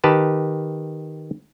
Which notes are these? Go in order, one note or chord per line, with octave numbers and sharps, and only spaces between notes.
D#3 G4 B4 A5